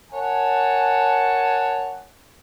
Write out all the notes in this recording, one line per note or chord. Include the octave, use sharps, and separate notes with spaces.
A#4 C#5 F#5 G#5 A5